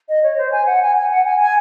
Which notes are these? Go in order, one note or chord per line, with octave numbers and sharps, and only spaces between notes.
D#5
C#5
C5
G#5
F#5
G#5
G#5
F#5
G#5
G#5